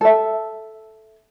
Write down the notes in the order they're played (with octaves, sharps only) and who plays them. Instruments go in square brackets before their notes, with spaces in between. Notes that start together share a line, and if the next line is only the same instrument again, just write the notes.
[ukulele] A4 E5